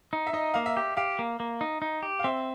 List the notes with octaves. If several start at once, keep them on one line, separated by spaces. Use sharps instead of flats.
D#4
E5
D#4 D#5
A#3 F5
E5
G4
G4 F5
A#3
A#3
D#4
D#4
G4
F5
C4 E5